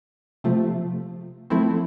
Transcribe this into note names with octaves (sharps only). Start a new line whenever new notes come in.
C3 F3 A3
F3 A3 C4 E4